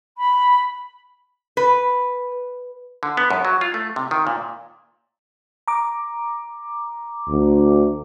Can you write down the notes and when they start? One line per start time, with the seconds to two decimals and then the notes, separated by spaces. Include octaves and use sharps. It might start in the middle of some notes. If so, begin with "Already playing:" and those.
0.17 B5
1.57 B4
3.03 D3
3.17 B3
3.30 F#2
3.45 F#3
3.61 F4
3.74 A3
3.96 C3
4.11 D#3
4.27 A#2
5.68 A#5 D6
7.28 D2